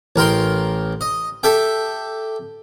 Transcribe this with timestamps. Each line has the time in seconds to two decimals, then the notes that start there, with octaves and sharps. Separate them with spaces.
0.16 A1 A#4 G5 C6
1.01 D#5
1.43 G4 A4 E5 G5